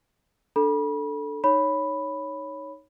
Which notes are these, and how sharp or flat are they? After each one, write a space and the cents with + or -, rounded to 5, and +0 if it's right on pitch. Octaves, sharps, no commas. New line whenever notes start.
D4 +0 A4 +0 B5 -35
D#4 +0 C#5 +0 B5 +0